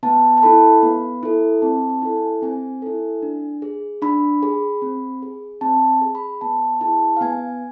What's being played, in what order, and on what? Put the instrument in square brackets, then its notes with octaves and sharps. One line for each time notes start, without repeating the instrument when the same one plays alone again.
[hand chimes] B3 A5
A5
E4 A4 B5
B3
E4 A4
C4 A5
A5
E4 A4
G#5
C4 G#5
E4 A4
D4
G#4
D4 B5
G#4
C4
G#4
C4 A5
G#4
B5
B3 A5
E4 G#4 A5
F5
B3 G#5